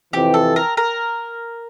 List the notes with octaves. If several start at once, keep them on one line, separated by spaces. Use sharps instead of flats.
F2 C3 E3 G4
A4
A#4
A#4